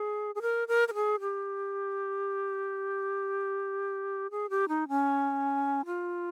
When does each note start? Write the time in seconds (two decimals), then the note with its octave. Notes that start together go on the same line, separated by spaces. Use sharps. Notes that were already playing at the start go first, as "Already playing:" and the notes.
Already playing: G#4
0.35 G#4
0.42 A#4
0.68 A#4
0.88 A#4
0.94 G#4
1.20 G4
4.31 G#4
4.50 G4
4.68 D#4
4.89 C#4
5.86 F4